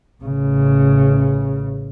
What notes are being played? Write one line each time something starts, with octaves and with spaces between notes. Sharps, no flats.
A1 C#3